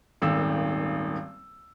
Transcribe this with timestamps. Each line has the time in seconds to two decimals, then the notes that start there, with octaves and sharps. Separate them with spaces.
0.22 D#1 G#1 D#3 E6